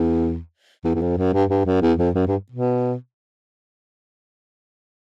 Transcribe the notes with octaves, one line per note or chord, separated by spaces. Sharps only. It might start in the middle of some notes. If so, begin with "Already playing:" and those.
Already playing: E2
E2
E2
F2
F#2
G2
G2
F#2
E2
F2
F#2
G2
B2